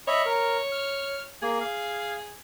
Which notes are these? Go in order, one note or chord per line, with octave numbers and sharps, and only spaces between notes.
C#5 D#5 E5 B5
A#4
F6
A#3 G#4
F5